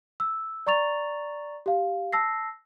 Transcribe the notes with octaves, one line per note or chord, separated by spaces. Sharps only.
E6
D5 A#5 C#6 A6 F7
G4 F5
A5 E6 A#6 C7